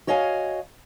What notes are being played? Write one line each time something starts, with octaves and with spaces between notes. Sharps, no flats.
F#4 C#5 D#5 F5 G#5